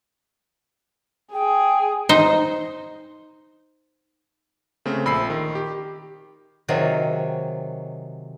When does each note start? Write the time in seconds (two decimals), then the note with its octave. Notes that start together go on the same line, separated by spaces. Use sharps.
1.33 G#4 G5
2.09 D#4 C5
4.85 C#3 A3 C4
5.06 A#1 B5 E6 C7
5.30 D#3
5.55 G4
6.68 C3 D#3 F#3 F4 G#4 C#5